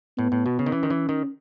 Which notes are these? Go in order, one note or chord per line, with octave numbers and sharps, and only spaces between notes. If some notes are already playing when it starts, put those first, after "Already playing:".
A2 B3
A2
B2
C#3
D#3
E3 C#4
D#3
E3
D#3